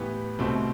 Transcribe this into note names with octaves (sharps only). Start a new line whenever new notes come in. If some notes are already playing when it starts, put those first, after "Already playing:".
Already playing: A2 E3 B3 G4
C2 B2 A3 C4